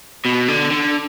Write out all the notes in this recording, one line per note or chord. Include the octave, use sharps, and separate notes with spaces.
B2
D3
D3